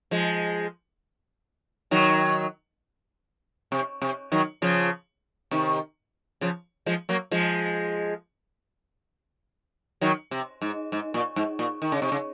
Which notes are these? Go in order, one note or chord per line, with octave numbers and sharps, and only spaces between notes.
F3 G#3
D#3 F#3
C3
C3
D#3 F#3
C#3 F3
C3 D#3
C#3 F3
F3 G#3
F#3 A#3
F3 G#3
D#3 F#3
C3
G#2
G#2
A#2
G#2
A#2
D#3
C#3
C3
C#3